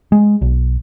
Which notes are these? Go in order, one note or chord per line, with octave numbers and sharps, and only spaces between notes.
G#3
B1